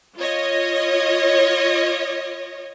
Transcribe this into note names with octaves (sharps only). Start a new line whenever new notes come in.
F4 C#5 D#5